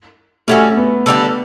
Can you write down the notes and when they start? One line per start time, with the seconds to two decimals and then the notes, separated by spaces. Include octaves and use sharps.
0.48 G3 A3 C#4 F#4 A4
0.77 B3
1.06 D3 G3 D4 A4